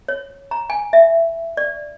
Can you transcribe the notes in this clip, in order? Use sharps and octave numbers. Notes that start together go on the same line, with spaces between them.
C#5
A#5
G#5
E5
D5